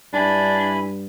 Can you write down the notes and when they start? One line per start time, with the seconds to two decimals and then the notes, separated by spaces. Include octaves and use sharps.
0.13 G2 D4 E4 G#5 B5